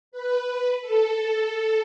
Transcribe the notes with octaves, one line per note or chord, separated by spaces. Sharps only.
B4
A4